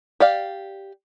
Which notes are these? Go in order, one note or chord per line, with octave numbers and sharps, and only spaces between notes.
G4 D5 F5